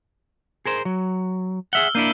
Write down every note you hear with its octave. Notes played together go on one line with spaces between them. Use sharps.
G#4 A#4 C5
F#3
G#4 E5 F#5 E6 F6 G7
A#3 D4 E4 G6 C7 D#7